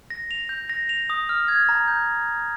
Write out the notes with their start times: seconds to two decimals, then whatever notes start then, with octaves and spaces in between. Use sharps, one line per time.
0.10 A#6
0.31 F7
0.49 G6
0.69 A#6
0.89 F7
1.10 D#6
1.29 F6
1.48 G#6
1.69 A#5
1.88 G6